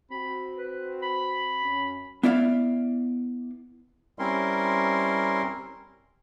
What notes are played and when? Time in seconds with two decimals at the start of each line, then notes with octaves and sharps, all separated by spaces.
0.11 C4 F#4 B5
0.56 B4
1.03 B5
1.62 F#2 C#4
2.23 B3 E4 D5 F5
4.19 G3 C4 C#4 E4 A#4 C6